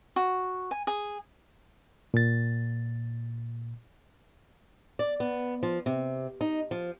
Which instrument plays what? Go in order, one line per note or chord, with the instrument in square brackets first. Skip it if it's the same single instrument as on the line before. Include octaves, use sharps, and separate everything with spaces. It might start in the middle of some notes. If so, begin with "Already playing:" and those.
[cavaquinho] F#4
G#5
G#4
[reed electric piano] A#2 A6
[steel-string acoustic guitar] D5
B3
F3
C3
D#4
F3